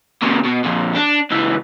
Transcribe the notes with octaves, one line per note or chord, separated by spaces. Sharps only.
A#2 C#3
B2
F2 A#2
D4
C#2 E3